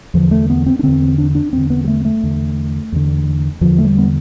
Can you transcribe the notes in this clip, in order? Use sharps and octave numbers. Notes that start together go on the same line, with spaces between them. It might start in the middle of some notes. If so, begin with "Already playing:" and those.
E2 D3 F3
A3
B3
C4
D4
E2 D3 C4
D4
D4
E2 D3 C4
B3
G3
A3
A3
E2 D3
E2 D3
E2 D3 F3
A3
G3
B3